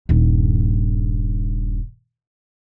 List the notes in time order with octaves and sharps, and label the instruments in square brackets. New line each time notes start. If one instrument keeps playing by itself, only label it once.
[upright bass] D#1 G2